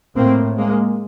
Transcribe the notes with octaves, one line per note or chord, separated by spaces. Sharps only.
A2 A#3 C4
G#3 A#3